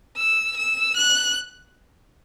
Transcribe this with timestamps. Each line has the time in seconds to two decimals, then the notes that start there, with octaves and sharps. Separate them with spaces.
0.17 E6
0.57 E6
0.97 F#6